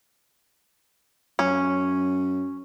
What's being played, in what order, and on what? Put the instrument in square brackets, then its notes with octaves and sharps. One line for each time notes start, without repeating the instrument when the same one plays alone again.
[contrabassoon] F#2 [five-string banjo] C#4